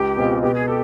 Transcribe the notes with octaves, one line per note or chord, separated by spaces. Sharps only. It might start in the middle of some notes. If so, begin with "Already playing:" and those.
Already playing: C#2 G4
B2 G#3 C4 F4
B2 G4
G#4
G4 A4